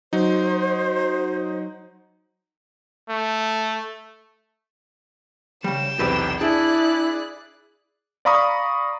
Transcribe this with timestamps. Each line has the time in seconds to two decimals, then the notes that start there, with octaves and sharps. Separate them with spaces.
0.13 F#3 D#4 C5
3.09 A3
5.64 C#3 G3 G5 E7
5.99 B1 E2 C3 G4 B4 D5
6.41 D4 E4 G#4 D5 F#6
8.25 D5 F5 A#5 B5 C#6 D#6